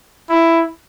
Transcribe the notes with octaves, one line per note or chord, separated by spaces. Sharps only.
E4